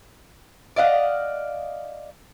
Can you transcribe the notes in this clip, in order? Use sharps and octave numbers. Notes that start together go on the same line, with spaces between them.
D5 D#5 F5 F#5